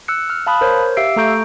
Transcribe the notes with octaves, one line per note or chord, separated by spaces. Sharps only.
E6 F#6 C#7
F6
F5 A5 B5 D#6 F#6
A#4 C5 C#5
G4 E5 F5 E6 C7 D7
A3 A4 A#5 C#6 G6 D7